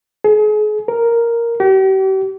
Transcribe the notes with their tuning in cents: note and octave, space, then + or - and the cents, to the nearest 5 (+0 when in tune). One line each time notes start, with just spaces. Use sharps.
G#4 +35
A#4 +0
G4 -40